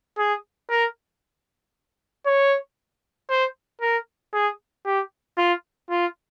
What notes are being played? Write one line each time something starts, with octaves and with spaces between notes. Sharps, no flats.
G#4
A#4
C#5
C5
A#4
G#4
G4
F4
F4